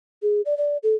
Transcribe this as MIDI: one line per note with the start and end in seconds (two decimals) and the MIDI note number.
0.22 0.41 68
0.45 0.57 74
0.57 0.77 74
0.83 0.95 69